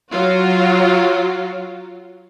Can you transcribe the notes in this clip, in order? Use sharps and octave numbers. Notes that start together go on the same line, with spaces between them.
F#3 F4 F#4